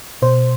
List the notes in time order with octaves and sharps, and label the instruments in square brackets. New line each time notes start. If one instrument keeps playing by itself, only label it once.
[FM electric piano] B2 C5